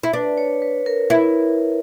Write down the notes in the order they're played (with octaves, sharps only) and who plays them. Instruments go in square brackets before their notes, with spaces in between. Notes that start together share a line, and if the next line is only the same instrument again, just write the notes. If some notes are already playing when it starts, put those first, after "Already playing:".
[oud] E4
[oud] D4 [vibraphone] B4
[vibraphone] C#5
B4
A#4
[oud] E4